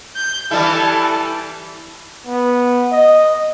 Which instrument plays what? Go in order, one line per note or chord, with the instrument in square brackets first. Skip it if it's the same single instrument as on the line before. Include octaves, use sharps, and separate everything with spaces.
[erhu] G6
[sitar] E3 G3 E4 [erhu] A4
[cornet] B3
D#5